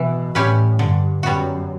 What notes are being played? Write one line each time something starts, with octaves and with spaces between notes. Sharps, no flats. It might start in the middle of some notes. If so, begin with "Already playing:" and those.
Already playing: B2 E3
A2 G3 C#4 G4 B4
G2 D3
F#2 G3 B3 F#4